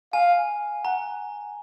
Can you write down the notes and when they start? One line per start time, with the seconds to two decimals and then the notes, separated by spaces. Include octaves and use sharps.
0.13 F5 G#5
0.85 F#5 A#5